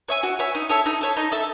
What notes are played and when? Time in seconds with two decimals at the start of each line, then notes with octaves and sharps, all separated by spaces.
0.08 C#5 E5 G#5
0.23 F#4
0.39 C#5 E5 G#5
0.55 D#4
0.69 A4 C#5 E5
0.86 D#4
1.01 A4 C#5 E5
1.17 D#4
1.32 A4 E5